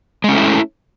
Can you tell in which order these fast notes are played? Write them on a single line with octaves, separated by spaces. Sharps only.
G#3 C#4 A3 E4